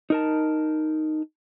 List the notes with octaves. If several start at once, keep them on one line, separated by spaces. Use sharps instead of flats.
D#4 A#4 A5